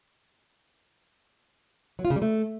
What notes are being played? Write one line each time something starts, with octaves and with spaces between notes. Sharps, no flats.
F#3
F4
C#3
G3
A3